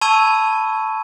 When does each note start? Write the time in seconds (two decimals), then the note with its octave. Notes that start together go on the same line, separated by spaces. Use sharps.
0.01 A5 B5 C#6 E6 G#6 D#7